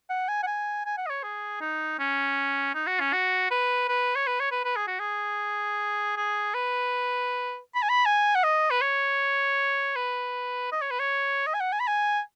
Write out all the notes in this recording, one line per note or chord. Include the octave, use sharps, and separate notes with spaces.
F#5
G#5
F#5
G#5
G#5
F#5
D#5
C#5
G#4
D#4
C#4
D#4
F#4
C#4
F#4
B4
B4
C#5
B4
C#5
B4
B4
G#4
F#4
G#4
G#4
B4
B5
G#5
B5
G#5
F#5
D#5
B4
C#5
B4
D#5
C#5
B4
C#5
D#5
G#5
F#5
G#5
B5
G#5